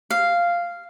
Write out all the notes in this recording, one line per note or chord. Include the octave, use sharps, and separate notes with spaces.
F5